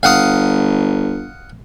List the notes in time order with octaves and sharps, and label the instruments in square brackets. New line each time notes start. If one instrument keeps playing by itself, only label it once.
[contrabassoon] G1 [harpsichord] F5 F#5 D#6